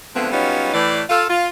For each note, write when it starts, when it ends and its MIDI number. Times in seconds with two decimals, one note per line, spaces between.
0.15 0.30 50
0.15 0.30 53
0.15 0.30 56
0.15 0.30 57
0.15 0.30 59
0.15 0.30 60
0.32 0.71 54
0.32 0.71 55
0.32 0.71 59
0.32 0.71 61
0.32 0.71 63
0.32 0.71 65
0.74 1.02 45
0.74 1.02 52
0.74 1.02 74
1.10 1.25 65
1.10 1.25 69
1.10 1.25 77
1.29 1.48 65